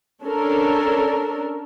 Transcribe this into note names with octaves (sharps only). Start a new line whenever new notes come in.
C#4 D4 A4 A#4